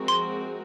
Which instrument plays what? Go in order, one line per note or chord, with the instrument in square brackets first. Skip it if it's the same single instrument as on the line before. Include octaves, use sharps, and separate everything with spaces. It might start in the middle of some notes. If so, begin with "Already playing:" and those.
Already playing: [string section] F3 G#3 C4 F#4 A#4
[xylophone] C6